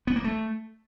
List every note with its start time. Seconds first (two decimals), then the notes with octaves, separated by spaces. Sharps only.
0.07 B3
0.16 A#3
0.24 A3